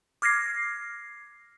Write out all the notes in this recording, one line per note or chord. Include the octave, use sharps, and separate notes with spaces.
D6 F6 G#6 A#6 C7